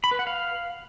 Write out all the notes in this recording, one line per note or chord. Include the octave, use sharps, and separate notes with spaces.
B5
B4
F#5
F5